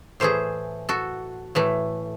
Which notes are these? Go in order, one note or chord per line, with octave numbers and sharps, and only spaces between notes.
A2 E3 A3 G#4 C5
F#4 A4
A2 E3 A3